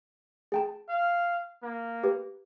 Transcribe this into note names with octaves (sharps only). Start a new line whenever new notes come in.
G#4 G5 A5
F5
A#3
G4 B4